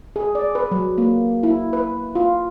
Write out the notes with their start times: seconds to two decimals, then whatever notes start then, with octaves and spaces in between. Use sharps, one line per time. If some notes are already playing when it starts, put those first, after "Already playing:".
0.16 G#4
0.35 D5
0.55 B4
0.71 F#3
0.98 A#3
1.43 E4
1.73 B4
2.15 F4